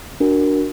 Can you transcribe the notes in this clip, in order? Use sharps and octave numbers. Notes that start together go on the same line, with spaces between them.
D4 F#4 A#4